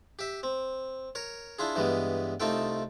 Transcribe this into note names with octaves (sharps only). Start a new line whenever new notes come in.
G4 E5
C4
A#4 C#5
D4 E4 F4 G#4
G2 E3 G3 G#3 B3
C2 A3 D#4 F4 A4 G5